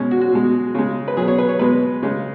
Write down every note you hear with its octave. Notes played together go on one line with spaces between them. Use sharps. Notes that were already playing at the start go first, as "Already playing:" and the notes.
Already playing: B2 G#3 C#4
F#4
F#4
B2 G#3
C#3 G#3
B4
B2 F#3 G#4
C#5
B4
C#5
B2 G#3 B4
C#3 G#3